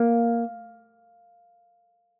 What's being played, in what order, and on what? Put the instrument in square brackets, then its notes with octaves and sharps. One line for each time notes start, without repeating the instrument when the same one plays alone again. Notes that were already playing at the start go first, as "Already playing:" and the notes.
Already playing: [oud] A#3